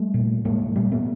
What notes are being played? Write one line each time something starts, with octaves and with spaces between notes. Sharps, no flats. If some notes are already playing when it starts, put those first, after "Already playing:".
Already playing: G3 A3
A#2
A2 G#3 A#3
A#2 G3 A3
A3 B3